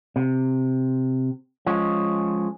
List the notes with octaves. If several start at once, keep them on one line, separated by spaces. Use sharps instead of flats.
C3
F3 G#3 C#4